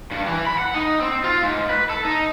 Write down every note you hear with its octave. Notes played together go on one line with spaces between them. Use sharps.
G2
E3
B5
F#5
D#4
C4
F4
G#2
B4
A4
D#4